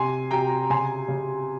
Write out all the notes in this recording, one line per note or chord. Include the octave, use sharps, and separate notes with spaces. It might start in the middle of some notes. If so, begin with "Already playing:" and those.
Already playing: C3 G#5 C6
C3 G5 A#5
C#3 G#5 C6
C#3